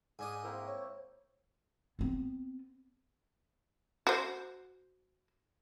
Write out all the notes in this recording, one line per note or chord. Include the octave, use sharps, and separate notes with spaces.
G#2 D4 G#5 D#6
A#3 C4 E4 A#4
C#5 C#6
B3 C4
F#4 C5